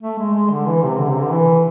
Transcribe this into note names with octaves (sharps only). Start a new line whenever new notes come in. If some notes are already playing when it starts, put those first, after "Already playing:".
A3
G#3
G#3
D3
E3
C3
D3
C3
D3
E3